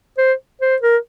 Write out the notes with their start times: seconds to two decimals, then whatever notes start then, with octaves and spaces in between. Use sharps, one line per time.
0.18 C5
0.61 C5
0.82 A#4